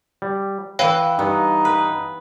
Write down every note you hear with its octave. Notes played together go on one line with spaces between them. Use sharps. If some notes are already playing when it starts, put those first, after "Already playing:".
G3
E3 E4 B4 C#5 F5 G5
G2 B3 D#4
B4